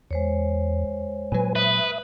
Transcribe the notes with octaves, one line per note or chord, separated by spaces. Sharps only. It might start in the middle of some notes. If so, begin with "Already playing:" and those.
E2 G#3 C5 C#5
A#2 F#3 B4 G#5
B4 E5 D#6